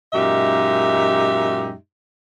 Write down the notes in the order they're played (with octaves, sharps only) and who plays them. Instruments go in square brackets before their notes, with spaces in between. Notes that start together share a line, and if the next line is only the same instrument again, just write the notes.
[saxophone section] F#2 A#2 G#3 D#4 G4 E5